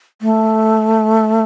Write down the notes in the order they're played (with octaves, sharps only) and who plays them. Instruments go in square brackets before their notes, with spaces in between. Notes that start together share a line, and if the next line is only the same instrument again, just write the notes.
[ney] A3